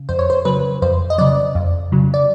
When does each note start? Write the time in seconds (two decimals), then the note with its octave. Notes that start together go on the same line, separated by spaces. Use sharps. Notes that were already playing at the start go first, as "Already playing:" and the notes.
Already playing: C#3
0.09 F2 C5
0.19 C#5
0.30 C5
0.45 C#3 F#3 B4
0.82 F2 C5
1.10 D#5
1.18 C#3 F#3 D5
1.55 F2
1.92 C#3 F#3
2.14 D5